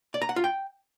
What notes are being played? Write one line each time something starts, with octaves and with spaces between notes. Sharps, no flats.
D5
A#5
F#5
F4
G5